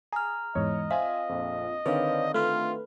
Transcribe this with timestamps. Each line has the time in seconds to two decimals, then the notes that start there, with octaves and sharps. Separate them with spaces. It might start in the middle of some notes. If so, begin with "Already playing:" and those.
0.12 G#4 G#5 A#5 F6
0.55 E2 G#2 C#5 D#5
0.91 C4 F4 E5 F5 G#5
1.29 A#1 F2
1.86 D3 D#3 C4 B4 C#5 D5 F5
2.34 A3 F4 B4 F6